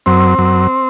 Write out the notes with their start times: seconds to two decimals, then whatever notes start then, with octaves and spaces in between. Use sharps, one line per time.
0.06 F#2 C4
0.38 F#2